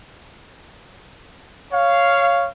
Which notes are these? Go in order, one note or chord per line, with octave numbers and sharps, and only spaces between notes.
C#5 F5